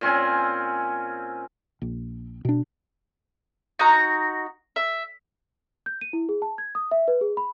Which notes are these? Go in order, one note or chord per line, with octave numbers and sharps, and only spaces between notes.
A#2 C4 C#4 G#5
A#1
B2 D4
D#4 F#4 A#5
E5
G6
D#7
E4
G#4
A5
G#6
D#6
E5
B4
G#4
B5